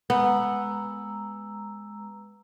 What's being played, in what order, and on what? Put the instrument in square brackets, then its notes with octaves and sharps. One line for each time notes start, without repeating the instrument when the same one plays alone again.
[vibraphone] G#3 A#5 E6 [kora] B3